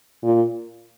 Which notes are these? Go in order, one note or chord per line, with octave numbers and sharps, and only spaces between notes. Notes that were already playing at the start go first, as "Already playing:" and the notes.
A#2